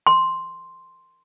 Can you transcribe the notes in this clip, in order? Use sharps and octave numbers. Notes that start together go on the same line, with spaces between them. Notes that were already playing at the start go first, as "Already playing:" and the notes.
C6